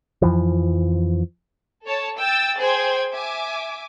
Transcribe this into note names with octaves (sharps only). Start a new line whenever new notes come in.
F2 E3 F3
A4 C#5 A5
G5 E6 A6
G#4 C5 G5 G#6
E5 G#5 D6